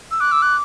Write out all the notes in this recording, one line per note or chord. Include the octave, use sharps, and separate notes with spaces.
E6
D6 F#6
E6
F#6